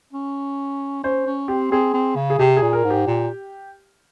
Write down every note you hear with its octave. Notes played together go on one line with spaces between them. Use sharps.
C#4
C#4 C5
C#4
C4 G4
C4 G#4
C4
C#3
G#4
C3 G4
G#4
A#2
A#4
G#2
G4
A#2